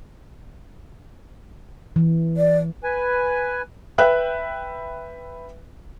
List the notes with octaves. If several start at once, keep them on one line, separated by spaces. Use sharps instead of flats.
E3
D5
B4 G#5
B4 E5 G5 F#6